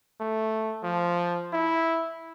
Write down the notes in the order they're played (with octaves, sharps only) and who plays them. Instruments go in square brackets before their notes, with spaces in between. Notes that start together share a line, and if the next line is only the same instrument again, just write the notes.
[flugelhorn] A3
F3
E4